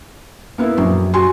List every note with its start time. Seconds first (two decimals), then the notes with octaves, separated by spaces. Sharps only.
0.58 A#3 B3 E4
0.78 A#1 F#2
1.14 F#4 G#5 C6